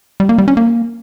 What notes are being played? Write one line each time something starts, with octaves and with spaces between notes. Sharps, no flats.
G3
A#3
G3
C#4
A#3